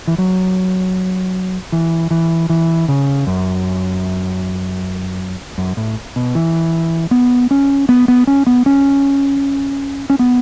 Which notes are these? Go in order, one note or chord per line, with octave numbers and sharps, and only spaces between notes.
E3
F#3
E3
E3
E3
C#3
F#2
F#2
A2
B2
E3
B3
C#4
B3
B3
C#4
B3
C#4
C#4
B3